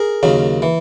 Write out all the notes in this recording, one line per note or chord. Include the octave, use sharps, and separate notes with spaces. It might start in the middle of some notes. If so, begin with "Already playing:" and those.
Already playing: G#4 A#4
D#2 C#3 F#3
E3